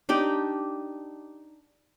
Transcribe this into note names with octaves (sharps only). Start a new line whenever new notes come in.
D4 D#4 G4 G5